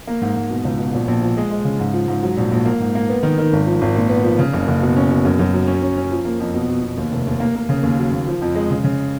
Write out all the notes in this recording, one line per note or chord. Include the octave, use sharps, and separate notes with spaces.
A#3
G#2
G#2
B2
C#2
B2
A#1
A#1
F3
G#3
G#3
C#3
G#2
F3
G#2
F#3
A#1
A#1
A#3
G#2
A#3
B3
D#3
D#3
G#1
F3
G#1
A#2
B3
F3
C#3
F#1
F#1
B2
C#4
B2
F#2
F#2
F#3
C#4
C#4
C#4
F3
A#3
F2
B2
B2
B2
D#2
F1
D#2
A#3
A#3
C#3
D#2
F#3
D#2
F3
F2
G#3
C#3
C#3